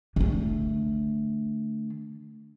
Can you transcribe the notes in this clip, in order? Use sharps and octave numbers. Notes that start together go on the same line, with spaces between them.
D3 A3